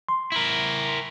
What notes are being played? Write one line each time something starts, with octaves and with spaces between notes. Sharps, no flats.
C6
E4 A#4